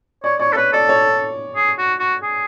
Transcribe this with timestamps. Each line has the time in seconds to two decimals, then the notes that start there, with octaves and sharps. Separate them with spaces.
0.24 C#5 D5
0.40 C#5 D5
0.53 A4
0.56 B4 C#5
0.73 A4 D5
0.89 C#5
1.56 G#4
1.79 F#4
2.00 F#4
2.23 G#4